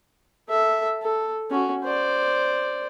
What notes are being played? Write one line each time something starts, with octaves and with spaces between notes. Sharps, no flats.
A4 E5
A4
C#4 F#4
C5 D5